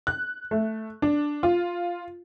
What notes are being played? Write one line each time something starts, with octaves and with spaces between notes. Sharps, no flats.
F#6
A3
D4
F4